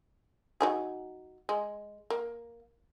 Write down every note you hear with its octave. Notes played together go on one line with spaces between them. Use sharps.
F#3 D#4 G#4
G#3
A#3